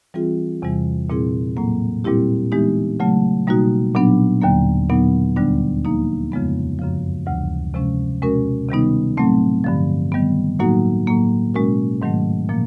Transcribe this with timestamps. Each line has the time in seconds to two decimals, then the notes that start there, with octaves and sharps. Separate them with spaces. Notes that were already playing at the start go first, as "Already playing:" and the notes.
0.14 E3 G3 C4 F4 G#4
0.62 E2 C3 E3 G3
1.10 A#2 G3 C4 E4 G#4
1.57 A2 F#3 A#3
2.04 A#2 G3 C4 E4 G4
2.52 E3 G#3 B3 D#4 G4
3.00 C#3 F#3 A3
3.47 B2 G3 A#3 D#4 F#4
3.94 A#2 F#3 B3 D4
4.42 D#2 D3 F#3 A#3
4.89 A#2 F#3 B3 D#4
5.36 D2 D3 G3 B3 D4
5.85 F3 A#3 D#4
6.32 F2 C#3 F3 G#3 B3
6.79 F#2 C#3 F3
7.26 D2 C3 E3 G3
7.74 C3 F3 G#3 C#4
8.22 B2 G#3 C#4 F#4 A#4
8.69 C3 D#3 G3 B3 D#4
9.17 A2 F#3 A3 C4
9.64 G2 D3 F3
10.12 D#3 G3 B3
10.59 A2 F#3 A#3 D#4 F#4
11.07 A2 F#3 A#3
11.54 B2 G#3 C#4 F#4 A#4
12.02 G#2 D#3 F#3 A3
12.49 A#2 F3 A#3